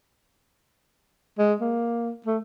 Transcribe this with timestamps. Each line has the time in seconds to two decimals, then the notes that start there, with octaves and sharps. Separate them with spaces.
1.39 G#3
1.61 A#3
2.26 A3